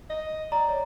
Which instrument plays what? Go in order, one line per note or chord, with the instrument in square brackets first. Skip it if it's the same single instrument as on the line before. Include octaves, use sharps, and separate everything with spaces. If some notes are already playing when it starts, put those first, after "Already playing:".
[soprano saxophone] D#5
[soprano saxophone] D5 [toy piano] A#5
[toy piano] C#5